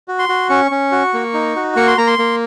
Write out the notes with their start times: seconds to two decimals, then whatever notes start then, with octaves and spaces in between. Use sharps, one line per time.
0.08 F#4
0.19 C6
0.29 F#4
0.49 C#4 C#6
0.71 C#4
0.92 F#4
1.14 A#3
1.34 D#4
1.56 F#4
1.76 A#3 C#6
1.87 C6
1.98 A#3 A#5
2.07 C6
2.19 A#3